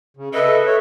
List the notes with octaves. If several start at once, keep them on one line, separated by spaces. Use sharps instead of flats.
C#3
A4 B4 D#5 E5
C#5 E5